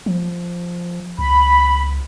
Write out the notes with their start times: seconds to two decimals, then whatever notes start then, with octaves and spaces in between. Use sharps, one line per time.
0.06 F3
1.19 C#2 B5